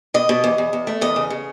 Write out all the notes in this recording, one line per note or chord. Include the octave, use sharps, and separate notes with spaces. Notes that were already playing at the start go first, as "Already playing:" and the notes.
B2 D#5
B2
E2
E2
E2
A3
E2 D#5
C#3
C#3